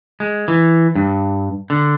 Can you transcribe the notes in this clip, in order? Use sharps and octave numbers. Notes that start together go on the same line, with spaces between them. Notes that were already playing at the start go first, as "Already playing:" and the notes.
G#3
E3
G2
D3